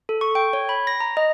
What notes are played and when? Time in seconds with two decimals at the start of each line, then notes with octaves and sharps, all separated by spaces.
0.09 A4
0.21 C#6
0.35 G5
0.53 C#5
0.69 B5
0.87 A#6
1.00 A#5
1.17 D#5